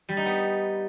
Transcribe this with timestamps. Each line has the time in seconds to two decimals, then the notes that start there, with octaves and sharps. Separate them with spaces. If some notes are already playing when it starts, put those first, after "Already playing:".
0.09 G3
0.17 D#4
0.25 B3